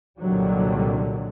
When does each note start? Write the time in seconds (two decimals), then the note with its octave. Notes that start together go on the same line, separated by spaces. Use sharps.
0.19 C2 A#2 D3 D#3 F#3 G3